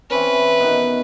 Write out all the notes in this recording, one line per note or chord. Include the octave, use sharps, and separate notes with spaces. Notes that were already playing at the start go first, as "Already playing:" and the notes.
E3 C4 C#4 B4
B2 D#3